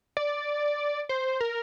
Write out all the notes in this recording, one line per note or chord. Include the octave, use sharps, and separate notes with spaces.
D5
C5
A#4